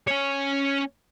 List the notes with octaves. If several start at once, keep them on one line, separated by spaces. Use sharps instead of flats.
C#4 C#5